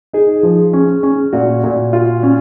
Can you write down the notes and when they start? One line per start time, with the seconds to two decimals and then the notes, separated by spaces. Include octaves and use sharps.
0.13 D#4 G#4
0.43 F3
0.73 C#4
1.03 C#4
1.33 A#2 F#4
1.64 A#2
1.93 F4
2.23 C#4